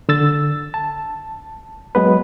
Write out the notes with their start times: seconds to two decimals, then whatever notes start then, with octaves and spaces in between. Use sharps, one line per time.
0.09 D3 E6 A6
0.74 A5
1.95 F#3 G#3 B3 B4